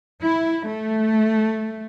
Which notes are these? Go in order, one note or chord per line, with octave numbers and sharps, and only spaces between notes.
E4
A3